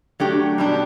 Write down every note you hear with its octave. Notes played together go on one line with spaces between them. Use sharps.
F#3 A3 D4 G4
B2 G3 D4 G4